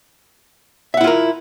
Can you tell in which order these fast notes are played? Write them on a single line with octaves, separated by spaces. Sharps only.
E5 F#5 E4 F4 A#4